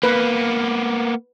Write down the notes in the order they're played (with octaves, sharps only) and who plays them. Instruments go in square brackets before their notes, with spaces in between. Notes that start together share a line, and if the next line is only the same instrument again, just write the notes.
[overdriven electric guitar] A#3 B3 [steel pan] B4